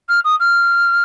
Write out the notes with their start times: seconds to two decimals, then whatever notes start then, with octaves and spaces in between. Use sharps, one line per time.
0.09 F6
0.25 D#6
0.40 F6